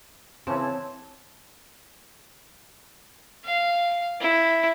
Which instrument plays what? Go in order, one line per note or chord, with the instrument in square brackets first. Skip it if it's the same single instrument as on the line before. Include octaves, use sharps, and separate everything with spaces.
[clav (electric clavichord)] C#3 E3 [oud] C4 [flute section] C#4 A5
[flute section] C#5 A5
[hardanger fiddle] F5
E4